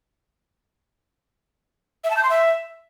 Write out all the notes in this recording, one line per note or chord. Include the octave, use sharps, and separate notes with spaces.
E5
A5
G6
C6
E5